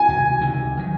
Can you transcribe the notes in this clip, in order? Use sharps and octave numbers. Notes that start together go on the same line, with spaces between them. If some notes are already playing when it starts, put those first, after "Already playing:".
Already playing: G#5
C#2 C3 D#3
C#2 C3 D#3
D#3 F#3